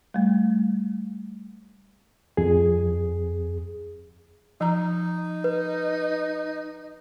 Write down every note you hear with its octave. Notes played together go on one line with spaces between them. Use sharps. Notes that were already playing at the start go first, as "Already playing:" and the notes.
G3 A3
F2 G#4
F3 D#4 A#5
B4